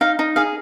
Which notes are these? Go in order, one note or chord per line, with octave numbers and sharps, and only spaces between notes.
D#4 F5
D#4
G#4 F5